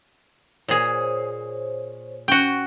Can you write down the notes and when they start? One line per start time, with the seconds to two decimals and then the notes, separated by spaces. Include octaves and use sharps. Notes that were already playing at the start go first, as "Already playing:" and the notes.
0.68 A#2 G#4 C5 C#5
2.28 C#4 F#4 G5